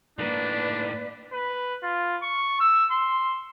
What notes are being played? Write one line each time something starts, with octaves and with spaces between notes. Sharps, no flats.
A2 D#3 A#3 D4 B4 D5
B4
F4
C#6
E6
C6